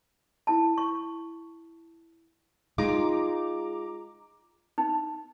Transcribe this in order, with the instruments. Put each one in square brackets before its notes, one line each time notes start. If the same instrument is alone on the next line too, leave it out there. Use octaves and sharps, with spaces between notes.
[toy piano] E4 A5
C#6
[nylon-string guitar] G#3 D#4 F4 [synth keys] A#5 D6
[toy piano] D#4